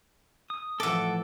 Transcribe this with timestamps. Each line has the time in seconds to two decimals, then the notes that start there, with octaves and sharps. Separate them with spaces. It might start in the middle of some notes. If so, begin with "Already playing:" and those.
0.50 D#6
0.80 A2 E3 F3 A4 E5 F#5 D6